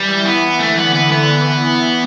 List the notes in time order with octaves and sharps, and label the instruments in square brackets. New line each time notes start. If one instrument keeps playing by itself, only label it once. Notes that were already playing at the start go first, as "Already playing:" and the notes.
Already playing: [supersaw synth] E3 [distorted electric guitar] G3
[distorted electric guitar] B3
[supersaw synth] D3 [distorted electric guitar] A3
[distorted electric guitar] B3
[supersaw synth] E3 [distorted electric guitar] B3
[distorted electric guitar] B3
[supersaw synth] E3